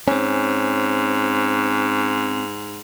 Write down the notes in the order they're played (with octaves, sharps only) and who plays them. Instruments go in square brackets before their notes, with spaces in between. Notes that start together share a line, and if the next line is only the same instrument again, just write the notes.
[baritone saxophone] G#2 [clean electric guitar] C4 C#4